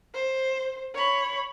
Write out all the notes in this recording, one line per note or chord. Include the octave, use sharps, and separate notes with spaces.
C5
C#5 B5